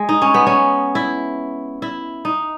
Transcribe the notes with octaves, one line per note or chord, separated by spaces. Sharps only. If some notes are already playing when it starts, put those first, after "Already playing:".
Already playing: G#3
D#4
C#4
B3
C#4
E4
E4
D#4